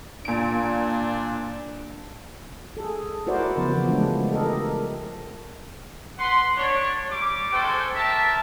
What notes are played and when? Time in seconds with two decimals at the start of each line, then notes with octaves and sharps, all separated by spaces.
0.25 A#2 D4 D7
2.77 G#4 A4
3.27 E4 F#4 A#4 C5 D5
3.56 C#3 F3 B3
3.74 E3 F3
3.88 F3 G#3 A3 D4
4.31 G4 A4 A#4 D#5
6.18 B4 F#5 C6
6.57 D4 C#5
7.10 G3 D6
7.52 G#3 A4 C5 G5 C#6
7.96 A#4 E5 A5